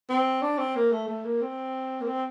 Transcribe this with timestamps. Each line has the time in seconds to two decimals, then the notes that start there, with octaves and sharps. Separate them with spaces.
0.10 C4
0.42 D4
0.59 C4
0.76 A#3
0.92 A3
1.08 A3
1.25 A#3
1.42 C4
2.01 A#3
2.07 C4